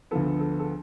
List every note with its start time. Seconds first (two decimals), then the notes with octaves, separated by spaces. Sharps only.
0.11 D2 D3 F3 B3 A4
0.40 A4
0.59 A4